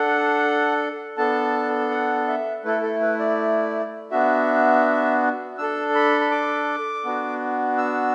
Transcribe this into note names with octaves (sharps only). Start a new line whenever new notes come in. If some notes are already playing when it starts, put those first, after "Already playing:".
Already playing: D4 A4 F#5
B3 D4 A4 A5
F#5
E5
A3 E4 A4 B4
A4
B4
D5
B3 D4 F#4 E5
D4 A4 E6
B5
B5
D6
B3 D4 F#4
E6